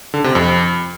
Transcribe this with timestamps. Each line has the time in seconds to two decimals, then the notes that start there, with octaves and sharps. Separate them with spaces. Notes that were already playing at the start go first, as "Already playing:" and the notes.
0.14 D3
0.24 C3
0.35 F2